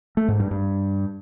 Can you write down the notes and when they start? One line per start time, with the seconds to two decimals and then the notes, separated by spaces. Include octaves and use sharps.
0.17 A3
0.28 G#2
0.40 G2
0.51 G2